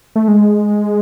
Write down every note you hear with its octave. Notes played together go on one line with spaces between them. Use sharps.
A3
G#3